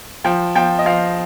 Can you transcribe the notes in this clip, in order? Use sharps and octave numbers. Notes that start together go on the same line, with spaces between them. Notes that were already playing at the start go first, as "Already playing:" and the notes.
F3 G5
F3 G5
D#5
F3 F5